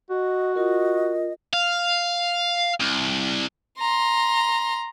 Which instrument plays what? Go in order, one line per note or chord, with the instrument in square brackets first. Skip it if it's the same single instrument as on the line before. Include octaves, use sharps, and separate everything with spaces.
[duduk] F#4 [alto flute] D#5
[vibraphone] F4 A#4 [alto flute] D#5
[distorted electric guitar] F5
C2
[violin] A#5 C6